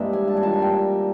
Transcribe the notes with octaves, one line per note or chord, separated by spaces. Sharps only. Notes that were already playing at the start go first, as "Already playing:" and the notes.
Already playing: G2 E3 G#3 A#3 D5 E5
G#5
A5
G#5
A#2 G3 A#3 A5
G#5
G5